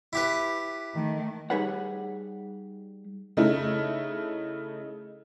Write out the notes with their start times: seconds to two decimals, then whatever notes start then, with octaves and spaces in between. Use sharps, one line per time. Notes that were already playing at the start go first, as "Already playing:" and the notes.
0.13 E4 G4 B4
0.95 D#3 A3
1.50 G3 D#4 G#4 B4 C#5 F#5
3.37 C#3 A3 D#4 E4